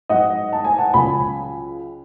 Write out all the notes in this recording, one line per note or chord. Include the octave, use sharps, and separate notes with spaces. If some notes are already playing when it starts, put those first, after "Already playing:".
G#2 F#3 D#5 F#5
A5
G#5
F#5 A5
C#2 C#3 F#3 G#5 B5